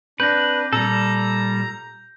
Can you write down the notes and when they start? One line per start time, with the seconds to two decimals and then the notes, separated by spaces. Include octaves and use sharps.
0.20 C4 D4 B4 G6 A#6
0.73 A#2 G3 A4 A#5